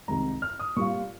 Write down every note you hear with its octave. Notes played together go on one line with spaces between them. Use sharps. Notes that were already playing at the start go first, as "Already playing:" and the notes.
C2 C3 D#3 G#3 A#5
F6
D#6
A#2 G3 C4 F4 C#6